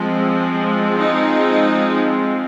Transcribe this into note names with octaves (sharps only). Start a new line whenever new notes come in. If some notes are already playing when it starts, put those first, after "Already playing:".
Already playing: F3 G#3 C4
D#4